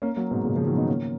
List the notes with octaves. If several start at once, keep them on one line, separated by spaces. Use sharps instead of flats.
A#3 C#4
F#3 A#3
G#2 B2
A#2 C#3
C#3 F3
D#3 F#3
B3 D#4
A#3 C#4